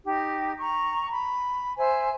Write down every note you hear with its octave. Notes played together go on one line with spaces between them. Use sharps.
D#4 G4
A#5 C#6
B5
C5 E5 G#5